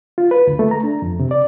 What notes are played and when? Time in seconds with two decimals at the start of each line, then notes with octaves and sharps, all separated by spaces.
0.18 F4
0.31 B4
0.47 D2
0.59 A3
0.71 A#5
0.83 D4
1.02 F2
1.20 C3
1.31 D5